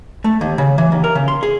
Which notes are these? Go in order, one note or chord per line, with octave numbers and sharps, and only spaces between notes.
A3
D#2
C#3
E3
D#2
A#4
C#3
C6
G#4